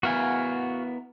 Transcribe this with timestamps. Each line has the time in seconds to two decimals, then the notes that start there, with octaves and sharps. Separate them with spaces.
0.03 B3 E4 F#4 A#4 F5 G#5